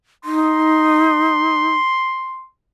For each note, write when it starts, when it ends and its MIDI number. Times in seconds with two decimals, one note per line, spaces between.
0.25 1.74 63
0.25 2.47 84